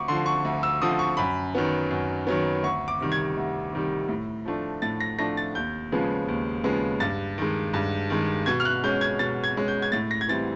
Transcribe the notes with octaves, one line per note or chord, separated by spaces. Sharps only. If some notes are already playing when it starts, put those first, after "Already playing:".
Already playing: D2 C#6 D6
D3 F3 C6
C#6
D2
E6
D3 F3 D#6
C#6
F#2 B5
D#3 F#3 B3
F#2
D#3 F#3 B3
D2 C#6
D6
C3 D#3 G3
G#6
D2
C3 D#3 G3
A2
F3 A3 D4
A2 A6
A#6
F3 A3 D4 A#6
A6
D#2 G6
C#3 F3 G#3 B3
D#2
C#3 F3 G#3 B3
G2 A6
D#3 G#3
G2
D#3 G#3
B2 G#6
F6
F#6
G#3 C#4 G6
G#6
B2 A6
G#6
G#3 C#4
G6
G#6
A2 A6
A#6
G#6
E3 G3 C4 A6